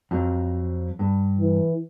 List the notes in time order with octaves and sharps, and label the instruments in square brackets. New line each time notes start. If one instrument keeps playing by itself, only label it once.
[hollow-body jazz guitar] F2 F3 F#3
G2
[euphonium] E3